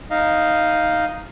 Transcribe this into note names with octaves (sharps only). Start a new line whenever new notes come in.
D#4 D#5 F5